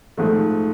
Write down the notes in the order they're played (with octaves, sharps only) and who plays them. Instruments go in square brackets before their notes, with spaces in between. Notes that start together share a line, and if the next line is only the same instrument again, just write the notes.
[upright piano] G#2 F3 A3